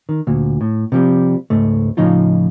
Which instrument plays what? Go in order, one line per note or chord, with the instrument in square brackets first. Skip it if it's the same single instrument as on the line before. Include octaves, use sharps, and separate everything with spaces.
[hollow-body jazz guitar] D#3
D2 A#2
A2
C3 F3 G3
C#2 G#2 A3
A2 C#3 F3 D#4 F4